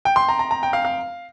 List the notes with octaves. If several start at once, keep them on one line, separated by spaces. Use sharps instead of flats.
G5
C6
A#5
A#5
A#5
G5
F5
F5